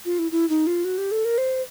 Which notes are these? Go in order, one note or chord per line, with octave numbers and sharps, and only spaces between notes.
F4
E4
E4
D#4
F4
F#4
G4
A4
A#4
C5